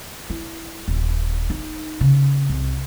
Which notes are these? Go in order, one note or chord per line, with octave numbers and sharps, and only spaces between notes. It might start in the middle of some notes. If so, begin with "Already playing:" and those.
E4
D#1
D#4
C#3
C2